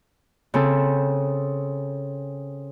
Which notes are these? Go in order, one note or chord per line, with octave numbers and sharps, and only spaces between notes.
C#3 C4 A4